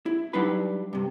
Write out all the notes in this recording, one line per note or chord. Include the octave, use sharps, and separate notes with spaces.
E4
F#3 G3 D4 D#4 B4 B5
G2 C3